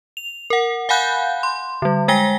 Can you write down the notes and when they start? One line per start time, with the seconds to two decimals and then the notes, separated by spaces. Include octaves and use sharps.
0.17 F7
0.50 A#4 F#5
0.89 F5 F#5 G#5 B5 F#6 G6
1.43 C6
1.82 D3 G3
2.08 G#3 G5 G#5 A#6 B6 G7